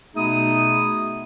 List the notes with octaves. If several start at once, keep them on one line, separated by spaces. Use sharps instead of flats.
B2 A3 B3 D#4 G#4 D#6